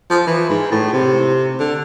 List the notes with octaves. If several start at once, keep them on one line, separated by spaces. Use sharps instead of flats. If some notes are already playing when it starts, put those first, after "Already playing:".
F3
E3
G#2
A2
C3
D3